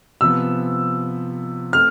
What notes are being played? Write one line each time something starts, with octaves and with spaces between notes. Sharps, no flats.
C3 F3 B3 E6
A3 C4 F6